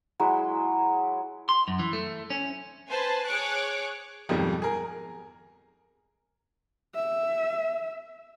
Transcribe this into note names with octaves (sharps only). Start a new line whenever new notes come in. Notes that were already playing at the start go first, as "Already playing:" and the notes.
F#3 G#3 E4
C6
F#2
E3
A3
C#4
B4 C5 G#5 A5
G#4 C#5 C#6 D6 F#6
F2 G#2 B2 D#3 F3 G3
G#4 A#4
E5